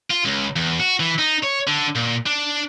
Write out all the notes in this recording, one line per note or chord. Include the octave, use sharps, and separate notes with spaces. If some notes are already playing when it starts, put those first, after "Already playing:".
F4
C#2
E2
F#4
E3
D#4
C#5
D3
A#2
D4